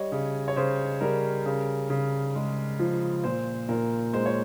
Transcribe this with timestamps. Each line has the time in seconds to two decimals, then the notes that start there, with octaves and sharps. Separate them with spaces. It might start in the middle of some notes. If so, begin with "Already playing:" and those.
Already playing: G3 C#5 D#5
0.12 C#3
0.48 C#5
0.56 C#3 C5
1.01 G3 A#4
1.46 C#3
1.90 C#3
2.36 G#3
2.79 F3
3.24 A#2 C5
3.69 A#2 A#4
4.13 G#3 C5
4.26 C#5